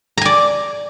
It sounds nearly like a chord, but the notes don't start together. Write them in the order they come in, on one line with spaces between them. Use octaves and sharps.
A#5 G#5 D5